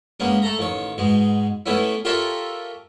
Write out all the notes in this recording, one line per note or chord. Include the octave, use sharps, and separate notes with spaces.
G#3 A#3 B3 C#4
A3 A4 A#5
A1 D#3 C#5
G#2 B2 G#3
E3 A3 B3 C#4 E4
F4 G4 A4 A#4 C#5 E5